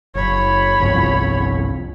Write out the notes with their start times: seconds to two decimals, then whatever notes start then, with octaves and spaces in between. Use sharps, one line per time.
0.15 F#1 C#5 B5
0.80 G1 C2 F2